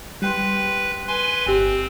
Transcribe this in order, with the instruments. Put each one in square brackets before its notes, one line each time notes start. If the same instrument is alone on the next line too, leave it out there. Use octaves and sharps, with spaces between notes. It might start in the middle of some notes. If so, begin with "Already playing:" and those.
[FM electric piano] G3 G5 C6 [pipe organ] B4
[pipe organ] B4 G#5 C6
[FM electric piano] G1 G4 [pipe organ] C4